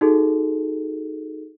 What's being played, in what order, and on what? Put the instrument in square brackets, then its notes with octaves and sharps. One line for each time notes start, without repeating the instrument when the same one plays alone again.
[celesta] D#4 F#4 G#4 A4